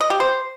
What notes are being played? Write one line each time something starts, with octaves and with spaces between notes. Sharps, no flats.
D#5
G4
C5